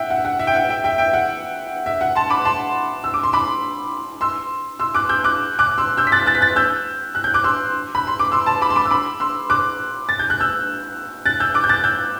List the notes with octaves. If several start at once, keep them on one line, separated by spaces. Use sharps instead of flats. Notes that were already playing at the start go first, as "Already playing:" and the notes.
Already playing: E5 F#5 G5
F#5
F#5
E5
G5
F#5
E5 G5
E5 G5
E5 G5
F#5
E5
F#5
A5 C6
B5 D6
A5 C6
E6
D6
C6
B5 D6
C6 E6
C6 E6
D6 F#6
E6 G6
D6 F#6
D6 F#6
C6 E6
E6 G6
B6
F#6 A6
F#6 A6
B6
F#6 A6
E6 G6
F#6
G6
D6 F#6
C6 E6
B5
C6
D6
C6 E6
A5 C6
B5 D6
C6
B5 D6
E6
B5 D6
C6 E6
D6 F#6
A6
G6
F#6
E6 G6
F#6 A6
E6 G6
D6 F#6
G6
F#6 A6
E6 G6